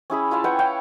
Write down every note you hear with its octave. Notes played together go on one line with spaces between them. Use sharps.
C#4 E4 G#4 B5
E4 F4 F5 A5
B4 F#5 G5 C#6
E4 C#5 F5 G5